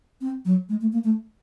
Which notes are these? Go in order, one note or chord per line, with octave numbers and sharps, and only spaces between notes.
C4
F#3
G#3
A3
A#3
A3